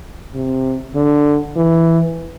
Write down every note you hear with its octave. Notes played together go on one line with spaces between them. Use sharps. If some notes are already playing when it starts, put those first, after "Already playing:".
C3
D3
E3